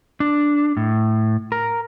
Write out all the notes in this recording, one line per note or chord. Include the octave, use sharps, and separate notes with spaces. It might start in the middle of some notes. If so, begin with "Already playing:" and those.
D4
A2
A#4